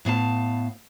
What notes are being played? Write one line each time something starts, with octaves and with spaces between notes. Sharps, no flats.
A2 B3 F5 A5